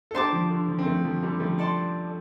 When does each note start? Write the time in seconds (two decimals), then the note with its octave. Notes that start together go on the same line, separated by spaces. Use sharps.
0.11 A4
0.14 D4 G4 C5 A5 D6
0.32 F3
0.50 D3
0.68 F3
0.79 C4
0.86 F3 A3
1.05 F3
1.23 D3 G3
1.40 F3 A3
1.59 A4 D5 A5 C6